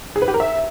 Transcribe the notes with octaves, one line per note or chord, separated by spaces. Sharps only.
G#4
B4
G4
A#4
E5